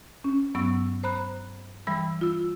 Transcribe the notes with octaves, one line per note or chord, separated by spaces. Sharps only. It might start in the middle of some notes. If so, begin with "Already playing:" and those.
C#4
G2 F#3 B3 C#6 E6
C5 A#5 B5 F#6
E3 G3 B5 E6
F4 E6